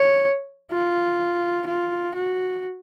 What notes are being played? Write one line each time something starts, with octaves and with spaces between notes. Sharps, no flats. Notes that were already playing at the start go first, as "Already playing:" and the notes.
Already playing: C#5
F4
F4
F#4